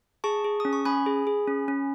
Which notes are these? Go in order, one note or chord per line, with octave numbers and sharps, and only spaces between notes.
G#4 A5 C#6
G#4
C#4 D#6
C#6
C#4 G#5 B5
G#4
G#4
C#4
C#4